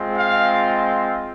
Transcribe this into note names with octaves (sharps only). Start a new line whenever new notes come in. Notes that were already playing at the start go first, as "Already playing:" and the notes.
Already playing: G#3 C4 F4
F5